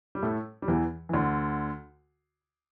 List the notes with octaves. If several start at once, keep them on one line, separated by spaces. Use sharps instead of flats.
G3
A2 A3
G3
E2 E3
E3
D2 D3